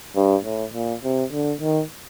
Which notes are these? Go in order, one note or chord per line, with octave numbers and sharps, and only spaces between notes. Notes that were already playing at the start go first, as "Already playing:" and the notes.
G2
A2
A#2
C3
D3
D#3